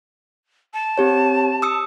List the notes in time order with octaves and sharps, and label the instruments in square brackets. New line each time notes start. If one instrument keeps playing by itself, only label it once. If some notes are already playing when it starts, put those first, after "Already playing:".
[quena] A5
[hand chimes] C4 G4 C#5
D#6 E6 C#7